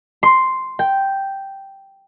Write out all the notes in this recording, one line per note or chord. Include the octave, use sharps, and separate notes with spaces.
C6
G5